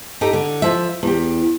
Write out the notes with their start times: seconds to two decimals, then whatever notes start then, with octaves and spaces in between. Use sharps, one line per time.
0.21 D#4 G4 A4
0.33 D3
0.62 F3 E5
1.03 E2 G4